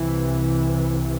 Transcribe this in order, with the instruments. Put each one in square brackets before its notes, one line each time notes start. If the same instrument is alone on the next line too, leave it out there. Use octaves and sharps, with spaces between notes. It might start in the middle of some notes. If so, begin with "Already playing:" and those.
Already playing: [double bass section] C2 C3 E3